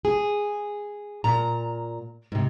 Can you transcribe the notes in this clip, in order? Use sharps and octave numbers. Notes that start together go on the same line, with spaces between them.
G#4
A#2 A#5
G#2 C3